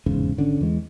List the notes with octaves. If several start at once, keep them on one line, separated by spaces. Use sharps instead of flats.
F1 E2 G#2 C#3
G#1 D3 C4 C#4
E2 E3 G#3